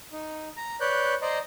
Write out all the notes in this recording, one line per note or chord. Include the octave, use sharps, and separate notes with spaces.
D#4
A#5
B4 C#5 D5 F#6 G6
C5 D5 D#5 A#5 C6